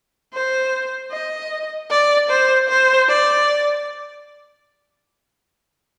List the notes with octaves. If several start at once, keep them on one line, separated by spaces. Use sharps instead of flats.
C5
D#5
D5
C5
C5
D5